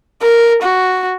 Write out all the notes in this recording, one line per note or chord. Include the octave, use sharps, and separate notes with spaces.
A#4
F#4